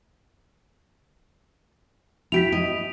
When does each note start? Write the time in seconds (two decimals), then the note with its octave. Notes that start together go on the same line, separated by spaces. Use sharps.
2.32 E4 G4 B6 D7 F7
2.52 D#5